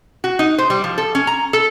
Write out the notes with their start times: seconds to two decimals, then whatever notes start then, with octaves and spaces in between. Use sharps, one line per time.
0.24 F#4
0.39 D#4
0.58 C5
0.70 G3
0.84 F3
0.98 A4
1.15 C#4
1.27 A#5
1.53 A4